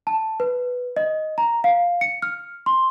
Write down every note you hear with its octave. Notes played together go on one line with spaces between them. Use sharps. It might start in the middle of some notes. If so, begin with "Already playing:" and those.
A5
B4
D#5
A#5
F5
C#7
F6
C6